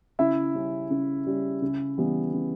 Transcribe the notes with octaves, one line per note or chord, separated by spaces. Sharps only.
C#3 E4 E5
G3 C#4
C#3
G3 C#4
C#3
E3 G3 B3
C#3